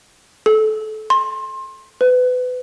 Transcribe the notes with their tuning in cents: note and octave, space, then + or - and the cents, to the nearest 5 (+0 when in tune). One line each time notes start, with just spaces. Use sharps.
A4 -25
C6 +25
B4 +30